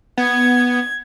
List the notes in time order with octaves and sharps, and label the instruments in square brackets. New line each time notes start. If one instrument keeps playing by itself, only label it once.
[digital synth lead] B3 [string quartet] G#6